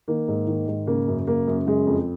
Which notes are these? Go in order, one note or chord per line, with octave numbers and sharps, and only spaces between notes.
D#3 A#3
G#2
D#3
G#2
C#3 A#3
F#2
C#3 A#3
F#2
C#3 G#3
F2